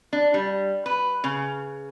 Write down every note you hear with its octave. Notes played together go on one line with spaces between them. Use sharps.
D4
G3
B4
C#3